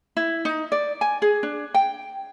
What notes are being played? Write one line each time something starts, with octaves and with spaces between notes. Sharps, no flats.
E4
D#4
D5
G#5
G#4
D4
G5